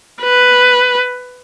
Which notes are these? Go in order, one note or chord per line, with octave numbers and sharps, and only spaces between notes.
B4